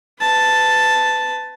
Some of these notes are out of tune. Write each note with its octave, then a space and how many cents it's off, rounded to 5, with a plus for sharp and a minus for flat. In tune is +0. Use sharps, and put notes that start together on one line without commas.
B4 +30 A5 +0